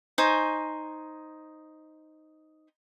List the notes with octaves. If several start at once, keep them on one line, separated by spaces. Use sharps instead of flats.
D#4 C5 G#5 C#6